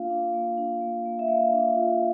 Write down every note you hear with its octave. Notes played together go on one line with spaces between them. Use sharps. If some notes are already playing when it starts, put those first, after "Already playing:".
Already playing: A#3 D4 F4 F5
D4
A#3
D4
A#3
A#3
E5
A#3 F5
D4
F4